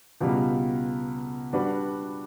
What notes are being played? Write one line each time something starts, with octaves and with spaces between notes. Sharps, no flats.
C#2 B2 G3
G3 D4 F#4 B4